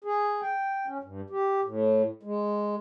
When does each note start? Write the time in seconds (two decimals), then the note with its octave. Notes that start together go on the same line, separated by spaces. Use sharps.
0.04 G#4
0.41 G5
0.86 C#4
1.03 G2
1.30 G4
1.64 A2
2.23 G#3